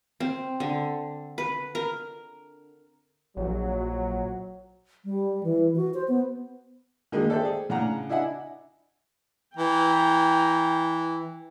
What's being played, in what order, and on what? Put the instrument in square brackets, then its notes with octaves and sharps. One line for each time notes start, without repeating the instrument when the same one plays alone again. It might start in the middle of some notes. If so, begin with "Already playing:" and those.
[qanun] C4
D3
B4
A#4
[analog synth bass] A#1 [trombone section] F#3
[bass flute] G3
E3
F#4
C5
B3
[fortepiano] D3 D#3 G#3 A#3 D#4 G#4
A4 C5 D5 E5 G5
G#4
A2 C#3 D4 F#5 A#5
D4 E4 D#5 E5 F#5 G#5
[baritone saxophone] E3 [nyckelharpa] G5 A#5